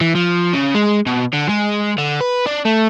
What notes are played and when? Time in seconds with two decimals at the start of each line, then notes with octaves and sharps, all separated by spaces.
0.01 E3
0.15 F3
0.53 C#3
0.75 G#3
1.07 B2
1.33 D3
1.49 G#3
1.98 D3
2.20 B4
2.46 D4
2.65 A3